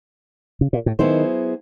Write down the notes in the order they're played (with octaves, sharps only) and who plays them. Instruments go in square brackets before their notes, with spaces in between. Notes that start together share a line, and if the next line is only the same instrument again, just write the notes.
[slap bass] C#3
A#2
A2
[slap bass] D#3 [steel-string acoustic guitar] F#3 B3 E4 G#4 C5